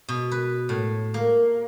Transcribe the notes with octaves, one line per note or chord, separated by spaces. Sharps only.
B2
B4
A2
A#3